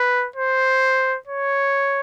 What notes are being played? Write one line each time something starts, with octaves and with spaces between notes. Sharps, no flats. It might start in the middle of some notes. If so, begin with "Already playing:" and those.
Already playing: B4
C5
C#5